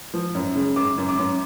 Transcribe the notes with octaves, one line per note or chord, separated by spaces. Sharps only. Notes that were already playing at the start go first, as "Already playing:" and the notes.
F3
F#2
C#3
F#2 D6
F#2
D6
F#2